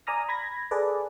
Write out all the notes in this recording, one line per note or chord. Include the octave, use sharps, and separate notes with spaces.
D5 G#5 A#5 D#6 F6 A#6
B5 G#6 A#6
G#4 A4 B4 D5